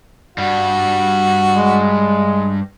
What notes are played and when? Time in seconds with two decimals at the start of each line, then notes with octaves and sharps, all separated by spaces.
0.38 G2 G3 F#4
1.53 G#3